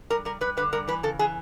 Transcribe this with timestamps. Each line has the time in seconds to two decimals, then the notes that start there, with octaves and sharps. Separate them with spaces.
0.10 G3 A#4
0.25 G3 A#4
0.41 G3 B4
0.57 D3 B4
0.73 G3 A#4
0.87 E3 B4
1.03 C#3 A4
1.19 E3 G#4